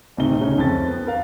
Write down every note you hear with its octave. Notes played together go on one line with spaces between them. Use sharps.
D1 C3 D#4 G7
C#3 C#4 D#4
F2 A6
B3
A#4 F5